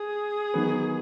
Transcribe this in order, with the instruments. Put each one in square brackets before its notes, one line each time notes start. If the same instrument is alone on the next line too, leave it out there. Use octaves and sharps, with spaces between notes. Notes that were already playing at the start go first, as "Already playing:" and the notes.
Already playing: [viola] G#4
[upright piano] D#3 F#3 B3